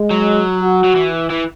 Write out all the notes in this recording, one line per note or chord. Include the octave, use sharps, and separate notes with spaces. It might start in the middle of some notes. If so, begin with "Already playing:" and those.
Already playing: G#3
F#3
F#4
F#3
E3
E3